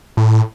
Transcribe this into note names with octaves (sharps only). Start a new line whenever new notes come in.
A2